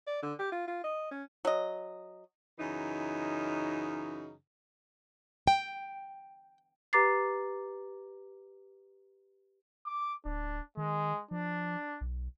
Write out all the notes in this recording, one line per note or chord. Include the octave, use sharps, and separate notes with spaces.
D5
D3
G4
F4
F4
D#5
C#4
F#3 D#5
F#2 C#3 E3 D#4
G5
G4 B4 A#5 D6 A6 C7
D6
D1 D4
D#3 G#3
F3 D4
B1